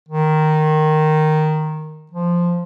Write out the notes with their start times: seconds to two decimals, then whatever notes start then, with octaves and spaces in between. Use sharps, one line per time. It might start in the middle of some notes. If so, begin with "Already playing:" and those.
0.09 D#3
2.11 F3